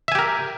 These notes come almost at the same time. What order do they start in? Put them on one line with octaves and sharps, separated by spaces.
E5 G#5 G4 A#4